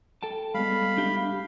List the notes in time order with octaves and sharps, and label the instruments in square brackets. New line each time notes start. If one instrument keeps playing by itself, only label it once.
[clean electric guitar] A4 G5 A5
[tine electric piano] G3 G#3 B3 [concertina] F5 B5
[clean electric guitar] D4 G4 E5